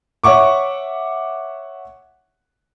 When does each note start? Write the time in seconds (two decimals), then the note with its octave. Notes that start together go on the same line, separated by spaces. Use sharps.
0.24 C#5 E5 F#5 C#6 D6